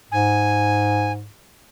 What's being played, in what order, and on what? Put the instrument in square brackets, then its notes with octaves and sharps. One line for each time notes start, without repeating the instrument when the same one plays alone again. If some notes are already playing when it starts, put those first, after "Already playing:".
[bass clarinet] G#2 [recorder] G#5